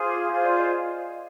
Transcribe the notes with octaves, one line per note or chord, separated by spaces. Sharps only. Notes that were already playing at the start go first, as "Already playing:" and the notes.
Already playing: F4 G#4 C5 D#6
D6
F4 G#4 C5 F5
D5
D#5